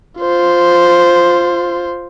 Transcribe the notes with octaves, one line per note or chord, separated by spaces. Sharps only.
F4 C5